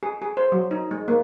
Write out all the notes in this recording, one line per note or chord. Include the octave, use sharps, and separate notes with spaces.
G#4
G#4
C5
F#3
D#4
G#3
A#3